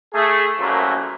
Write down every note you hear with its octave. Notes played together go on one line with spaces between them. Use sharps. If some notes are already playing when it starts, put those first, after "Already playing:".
A3 G#4
C2 F#2 A#2 F3 F#3 A3